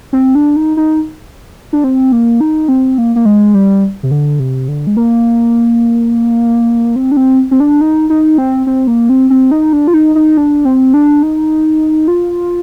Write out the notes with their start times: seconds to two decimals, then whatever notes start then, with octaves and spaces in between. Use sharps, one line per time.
0.13 C4
0.35 D4
0.56 D#4
0.77 D#4
1.73 D4
1.84 C4
2.12 A#3
2.40 D#4
2.68 C4
2.98 A#3
3.16 A#3
3.25 G#3
3.54 G3
4.03 C3
4.11 D3
4.40 C3
4.68 D3
4.87 G#3
4.97 A#3
6.96 C4
7.12 D4
7.17 C4
7.51 C4
7.60 D4
7.81 D#4
8.10 D#4
8.38 C4
8.67 C4
8.87 A#3
9.09 C4
9.30 C4
9.51 D#4
9.73 D4
9.87 F4
9.94 D#4
10.15 D#4
10.37 D4
10.65 C4
10.94 D4
11.23 D#4
12.08 F4